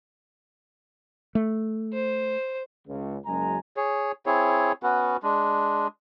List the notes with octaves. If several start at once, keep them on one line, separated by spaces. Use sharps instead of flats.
A3
C5
C#2
F#1 F#2 G#3 G#5 A#5
G#4 C#5
C4 E4 G#4 C#5
B3 C#4 F#4 B4
G#3 D4